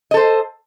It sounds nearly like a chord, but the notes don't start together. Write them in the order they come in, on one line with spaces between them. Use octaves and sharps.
D#5 A4 C5